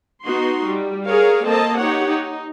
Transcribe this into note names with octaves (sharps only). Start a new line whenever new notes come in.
B3 D#4 F#4 C6
G3
G#4 A#4 C#5 F5
A#3 C4 A4 D#5 A5
D#4 G4 C#5 F#5
D#4